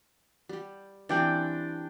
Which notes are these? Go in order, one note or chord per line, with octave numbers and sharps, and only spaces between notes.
G3 G4
E3 G3 C4 D4 G5